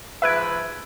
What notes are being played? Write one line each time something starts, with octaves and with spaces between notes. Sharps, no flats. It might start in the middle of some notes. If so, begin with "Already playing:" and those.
G#2 F3 B4 E5 E6 F#6 G#6 D7